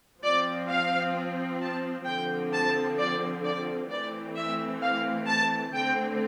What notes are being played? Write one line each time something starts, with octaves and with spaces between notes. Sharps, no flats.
F3 C4 D5
F5
A5
D3 F3 C4 G5
A5
D5
D5
E3 A3 C4 D5
E5
F5
A5
D3 A3 C4 G5